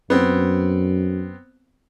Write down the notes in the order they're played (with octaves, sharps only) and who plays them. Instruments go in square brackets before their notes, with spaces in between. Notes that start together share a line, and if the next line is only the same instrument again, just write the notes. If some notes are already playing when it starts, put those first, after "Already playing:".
[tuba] F#2 [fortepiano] B3 C4